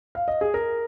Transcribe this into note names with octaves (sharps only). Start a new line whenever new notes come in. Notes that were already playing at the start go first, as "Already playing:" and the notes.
F5
D#5
G#4
A#4